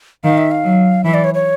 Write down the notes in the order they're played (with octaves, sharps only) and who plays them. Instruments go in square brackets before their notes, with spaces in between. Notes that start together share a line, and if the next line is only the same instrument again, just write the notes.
[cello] D#3 [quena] F5
[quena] E5
F5
[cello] F#3
[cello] E3 [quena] E5
[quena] D5
C#5
C#5